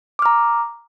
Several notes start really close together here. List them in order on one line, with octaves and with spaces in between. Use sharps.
D6 F6 A#5